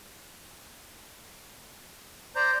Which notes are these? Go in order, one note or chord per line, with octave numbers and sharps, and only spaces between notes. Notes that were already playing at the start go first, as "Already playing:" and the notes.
C5 D5 A#5 G6